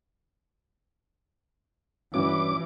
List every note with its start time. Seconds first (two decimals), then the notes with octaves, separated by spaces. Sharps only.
2.14 G2 E3 C#4 F#4 D6